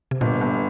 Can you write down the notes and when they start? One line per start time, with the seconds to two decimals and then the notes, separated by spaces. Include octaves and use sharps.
0.11 C3
0.21 G1 A#2
0.41 G1